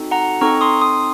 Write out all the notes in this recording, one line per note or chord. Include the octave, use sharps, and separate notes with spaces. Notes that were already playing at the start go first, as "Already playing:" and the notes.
Already playing: C4 D#4 F#4 A4
F#5 A#5
C4 D#4 A4 A#5 C#6
C6 D#6
C6 D#6